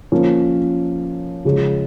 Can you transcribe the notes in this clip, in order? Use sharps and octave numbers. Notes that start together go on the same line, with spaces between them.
F3 A#3 C#4
C#3 F3 G#3